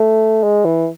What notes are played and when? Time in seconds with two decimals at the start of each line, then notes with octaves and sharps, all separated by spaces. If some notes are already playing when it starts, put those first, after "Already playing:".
Already playing: A3
0.43 G#3
0.65 E3